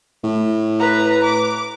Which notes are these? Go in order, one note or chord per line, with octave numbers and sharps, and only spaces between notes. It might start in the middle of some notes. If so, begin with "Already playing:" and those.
A2
B4 A#5
D6